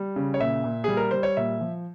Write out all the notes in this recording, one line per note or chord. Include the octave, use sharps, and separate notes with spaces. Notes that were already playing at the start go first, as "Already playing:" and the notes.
Already playing: G3
C#3
C#5
A#2 E5
A#2
G3 G#4
A#4
G3 C5
C#5
A#2 E5
F3